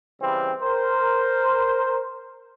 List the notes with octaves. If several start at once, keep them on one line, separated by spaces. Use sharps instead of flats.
C#3 E3 G3 C4
A#4 C5